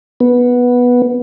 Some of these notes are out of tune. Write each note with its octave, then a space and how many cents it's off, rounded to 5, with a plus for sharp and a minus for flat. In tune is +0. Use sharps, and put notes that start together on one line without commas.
B3 -10